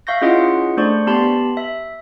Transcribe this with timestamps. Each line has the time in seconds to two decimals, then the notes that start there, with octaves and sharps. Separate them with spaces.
0.07 E5 F5 C#6 G6 A#6
0.22 C#4 E4 F4 G#4 D#5 F#5
0.77 A3 D4 C5 D5 C#6
1.07 B3 G4 A5 B5 C6
1.57 E5